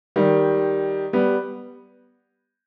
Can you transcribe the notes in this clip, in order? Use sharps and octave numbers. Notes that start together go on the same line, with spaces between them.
D#3 G3
G3 B3